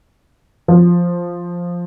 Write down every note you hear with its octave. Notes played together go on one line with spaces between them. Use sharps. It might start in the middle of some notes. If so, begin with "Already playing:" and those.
F3